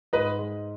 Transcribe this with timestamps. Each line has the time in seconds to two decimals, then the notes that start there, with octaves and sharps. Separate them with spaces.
0.13 G#2 B4 D#5
0.39 G#3